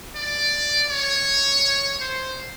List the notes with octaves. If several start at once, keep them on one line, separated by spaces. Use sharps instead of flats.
D5
C#5
C5